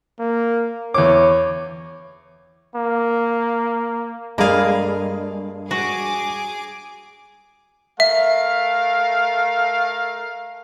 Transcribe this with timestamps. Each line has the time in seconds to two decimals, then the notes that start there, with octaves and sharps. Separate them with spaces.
0.19 A#3
0.94 E2 C#5 D6
2.75 A#3
4.38 G2 G#3 A#3 G#4 A4 D5 F5 B5
5.71 F#4 G#4 D6
8.00 A3 A#4 E5 F5